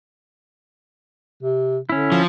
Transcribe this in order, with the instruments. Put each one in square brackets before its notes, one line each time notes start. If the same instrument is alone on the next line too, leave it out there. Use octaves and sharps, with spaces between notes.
[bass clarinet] C3
[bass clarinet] D3 [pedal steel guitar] C#4 E4
[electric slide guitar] F3